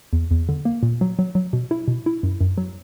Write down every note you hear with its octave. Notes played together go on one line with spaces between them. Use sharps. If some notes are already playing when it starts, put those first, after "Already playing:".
E2
E2
D3
A#3
A#2
F#3
F#3
F#3
B2
E4
B2
E4
F#2
F#2
F#3